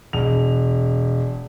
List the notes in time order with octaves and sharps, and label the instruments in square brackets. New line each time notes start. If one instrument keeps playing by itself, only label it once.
[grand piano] E1 F7